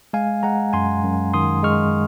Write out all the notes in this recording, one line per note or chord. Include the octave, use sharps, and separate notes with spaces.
G#3 F5 G#5
G#3 F#5 A#5
F#2 G#5 C6
F#2
D#3 C6 D#6
G#3 C#6 F6